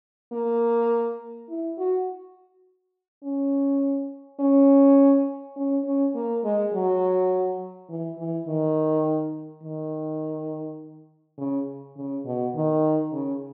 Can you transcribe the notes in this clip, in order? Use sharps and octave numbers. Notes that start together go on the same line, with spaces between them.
A#3
E4
F#4
C#4
C#4
C#4
C#4
A#3
G#3
F#3
E3
E3
D#3
D#3
C#3
C#3
B2
D#3
C#3